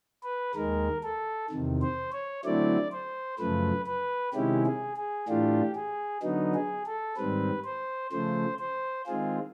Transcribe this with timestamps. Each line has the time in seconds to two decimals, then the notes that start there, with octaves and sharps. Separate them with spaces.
0.24 B4
0.55 D#2 D#3 G#3 A#4
1.03 A4
1.50 E2 C3 D#3
1.82 C5
2.13 C#5
2.45 D3 F#3 A3 C4 E4 D5
2.92 C5
3.39 F#2 C#3 F3 A3 B4
3.87 B4
4.33 C3 D#3 G#3 C#4 E4 G4
4.66 G#4
4.97 G#4
5.29 A2 E3 A3 D4 F4 G4
5.75 G#4
6.23 D3 F#3 B3 D#4
6.54 G#4
6.86 A4
7.17 G#2 D#3 G3 C4 B4
7.65 C5
8.12 C#3 F3 A3 C5
8.59 C5
9.07 D#3 G#3 C4 F4 G#4